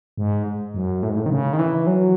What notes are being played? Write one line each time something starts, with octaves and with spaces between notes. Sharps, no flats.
G#2
F#2
A2
G#2
A2
D#3
C#3
D#3
E3
F#3